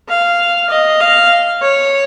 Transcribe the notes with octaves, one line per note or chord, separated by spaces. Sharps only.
F5
D#5
F5
C#5